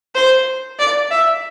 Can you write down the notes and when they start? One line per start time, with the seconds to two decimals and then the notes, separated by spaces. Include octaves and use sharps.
0.15 C5
0.79 D5
1.11 E5